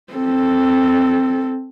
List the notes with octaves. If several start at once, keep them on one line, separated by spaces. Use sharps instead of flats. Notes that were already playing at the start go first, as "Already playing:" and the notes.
C4 A4